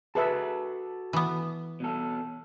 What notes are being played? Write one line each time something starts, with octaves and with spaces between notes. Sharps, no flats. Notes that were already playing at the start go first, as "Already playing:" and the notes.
F#4 G#4 A4 B4 E5 A5
E3 B3
B2 A4